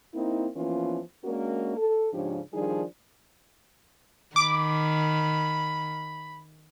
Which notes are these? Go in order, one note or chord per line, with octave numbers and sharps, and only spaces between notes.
A#3 C4 D#4 E4
E3 F3 A#3 B3 C#4 F4
G#3 A#3 C#4 D4 F#4 A#4
A4
G#2 C#3 F3 C#4 D4 G4
D#3 F3 G3 D4 D#4 G#4
D#3 B5 D6